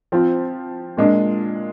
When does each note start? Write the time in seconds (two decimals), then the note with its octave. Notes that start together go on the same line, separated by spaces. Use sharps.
0.12 F3 C4 F4
0.97 A#2 G#3 D4 F4